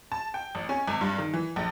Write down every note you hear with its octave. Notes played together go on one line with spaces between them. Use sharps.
A5
G5
A1
C#4
G#1
G2
D#3
E3
A#1